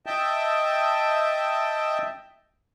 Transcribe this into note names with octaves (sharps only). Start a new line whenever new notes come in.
D#5 E5 G5 A5